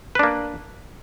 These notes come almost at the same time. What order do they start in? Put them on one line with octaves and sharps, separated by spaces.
B4 D4 A#3